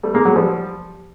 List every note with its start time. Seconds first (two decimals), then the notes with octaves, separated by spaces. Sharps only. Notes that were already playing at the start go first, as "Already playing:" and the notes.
0.03 G3 A3
0.14 G#3 A#3
0.25 F#3 G#3
0.36 F3 G3